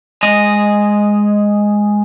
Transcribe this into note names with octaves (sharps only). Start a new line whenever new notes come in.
G#3 D#5